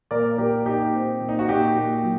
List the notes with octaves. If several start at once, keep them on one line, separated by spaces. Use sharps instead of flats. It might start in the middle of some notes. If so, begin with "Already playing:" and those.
A#2 A#4 D5
A#2 G4 A#4
A#2 D#4 G4
C4
A#2
D#4
F#4
A#2 D#4 G4
A#2
F#3